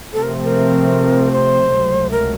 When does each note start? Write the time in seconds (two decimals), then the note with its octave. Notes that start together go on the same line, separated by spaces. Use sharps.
0.13 C3 F3 A3 C4 A4
0.23 A#4
0.43 A#4
1.32 C5
1.72 C#2 C3 F#3 A3
2.11 A#4